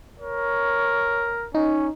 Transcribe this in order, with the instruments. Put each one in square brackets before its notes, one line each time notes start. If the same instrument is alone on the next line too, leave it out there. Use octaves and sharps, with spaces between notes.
[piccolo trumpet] A#4 [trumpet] C#5
[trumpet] C#4 [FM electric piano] D#4